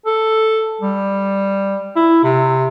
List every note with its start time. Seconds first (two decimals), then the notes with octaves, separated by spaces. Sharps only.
0.06 A4
0.81 G3
1.96 E4
2.24 C3